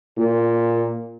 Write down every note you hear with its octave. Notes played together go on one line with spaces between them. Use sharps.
A#2